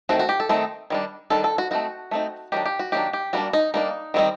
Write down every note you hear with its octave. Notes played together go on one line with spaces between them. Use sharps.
D#3 A3 C4 D#4 F#4
F#4
G4
A4
D#3 A3 C4 D#4
D#3 G3 D4
D#3 G3 D4 A4
A4
F#4
A3 C4 D#4 F#4
A3 C4 D#4
D#3 F#3 A#3 D4 G4
G4
F#4
D#3 F#3 A#3 D4 G4
G4
G3 A#3 D4 F#4
D#4
G3 A#3 D4 D#4
D#3 G3 C4 D#4